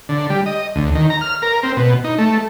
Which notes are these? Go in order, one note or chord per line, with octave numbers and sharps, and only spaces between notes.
D3
G3
D#5
D2
D#3
A#5
F6
A#4
C4
B2
D#4
A3